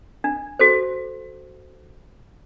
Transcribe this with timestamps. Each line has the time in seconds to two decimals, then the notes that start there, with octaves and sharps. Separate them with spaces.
0.24 D4
0.59 F#4 A4 C5